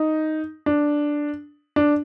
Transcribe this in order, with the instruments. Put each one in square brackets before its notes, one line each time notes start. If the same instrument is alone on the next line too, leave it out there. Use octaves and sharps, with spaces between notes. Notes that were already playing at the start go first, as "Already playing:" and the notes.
Already playing: [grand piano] D#4
D4
D4